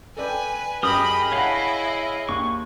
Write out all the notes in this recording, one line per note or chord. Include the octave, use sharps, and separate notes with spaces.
A4 B4 D5 G5 G#5
F#2 G4 G#4 A#4 D#5 G5 B5 D#6
E4 C#5 F5 F#5 A5 B5
D#2 C#6